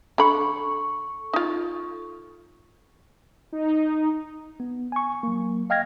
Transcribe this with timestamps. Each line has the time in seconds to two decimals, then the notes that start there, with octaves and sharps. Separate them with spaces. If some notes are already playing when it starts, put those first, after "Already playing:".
0.18 D3 A4 B5 C#6
1.33 D#4 F4
3.52 D#4
4.60 B3
4.92 G#5 C#6
5.23 F#3 A#3
5.70 D#5 F5 G5 F6 G#6 A#6